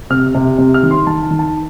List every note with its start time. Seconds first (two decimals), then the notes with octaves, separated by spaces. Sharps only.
0.10 C3 F6
0.35 C3
0.58 C3
0.74 F6
0.83 D#3
0.91 C6
1.07 D#3 A5
1.23 A5
1.30 D#3
1.39 A5